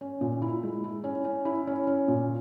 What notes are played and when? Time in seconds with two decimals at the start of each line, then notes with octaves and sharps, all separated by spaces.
0.01 C#4
0.21 A#2
0.42 E4
0.63 G#3
0.84 E4
1.04 C#4
1.25 C#4
1.45 E4
1.67 C#4
1.87 C#4
2.08 A#2